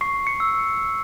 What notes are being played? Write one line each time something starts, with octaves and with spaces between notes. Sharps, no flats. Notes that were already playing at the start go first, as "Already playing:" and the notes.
C#6 C7
C#7
E6